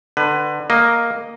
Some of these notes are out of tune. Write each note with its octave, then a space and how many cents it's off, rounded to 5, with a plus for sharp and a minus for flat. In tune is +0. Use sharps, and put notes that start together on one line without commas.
D3 +30 B4 +15
A#3 +0 D#5 +0